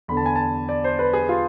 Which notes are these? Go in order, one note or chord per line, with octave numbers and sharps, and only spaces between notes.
E2 D3 B5
A5
G#5
A5
D5
C5
B4
G#4
F4